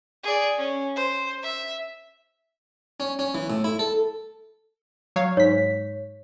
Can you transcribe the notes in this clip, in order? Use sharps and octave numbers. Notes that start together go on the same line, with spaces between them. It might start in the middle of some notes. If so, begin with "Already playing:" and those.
G#4 D5
C#4
C5
E5
C#4
C#4
E3
A2
E4
A4
F#3 C#5 F5
G#2 C#5 B6